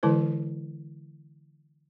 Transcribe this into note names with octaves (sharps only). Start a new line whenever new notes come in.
D3 E3 G#3 E4 B4 C5